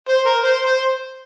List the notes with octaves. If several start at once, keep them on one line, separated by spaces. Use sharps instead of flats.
C5
A#4
C5
C5